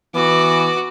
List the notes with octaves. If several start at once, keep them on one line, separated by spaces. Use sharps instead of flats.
E3 B3 F#4 D6